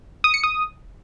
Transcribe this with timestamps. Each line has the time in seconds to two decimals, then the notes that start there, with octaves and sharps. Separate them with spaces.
0.24 D#6
0.34 C#7
0.44 D#6